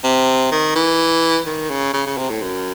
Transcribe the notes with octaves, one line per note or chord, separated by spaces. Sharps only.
C3
D#3
E3
D#3
C#3
C#3
C#3
C3
A2
F#2